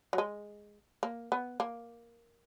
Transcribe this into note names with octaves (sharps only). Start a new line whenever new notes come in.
F#3
G#3
A#3
B3
A#3